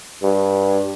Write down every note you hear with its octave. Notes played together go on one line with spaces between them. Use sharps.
G2